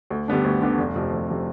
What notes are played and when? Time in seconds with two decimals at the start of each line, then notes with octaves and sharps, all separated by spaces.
0.10 D2
0.28 D3 G3 B3 D4
0.44 D2
0.62 D3 G3 B3 D4
0.78 F1
0.96 F2 C3 F3
1.13 F1
1.30 C3 F3